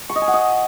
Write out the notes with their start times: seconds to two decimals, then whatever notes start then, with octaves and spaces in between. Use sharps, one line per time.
0.10 C#6
0.16 D#5
0.22 G#5
0.28 F#5
0.34 D#5